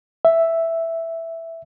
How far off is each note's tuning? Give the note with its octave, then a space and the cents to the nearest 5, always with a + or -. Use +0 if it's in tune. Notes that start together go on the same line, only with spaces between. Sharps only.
E5 +0